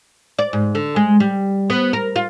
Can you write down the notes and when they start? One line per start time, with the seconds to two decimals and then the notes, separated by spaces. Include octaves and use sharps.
0.39 D5
0.53 G#2
0.75 D3
0.96 G#3
1.20 G3
1.70 B3
1.93 A#4
2.16 F4